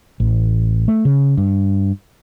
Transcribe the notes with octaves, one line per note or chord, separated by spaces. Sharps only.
A1
A3
C#3
G2